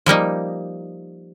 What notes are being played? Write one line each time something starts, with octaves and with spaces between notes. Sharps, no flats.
F3 G3 A#3 D#4